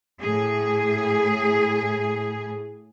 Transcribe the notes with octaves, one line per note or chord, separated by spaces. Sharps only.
A2 G#4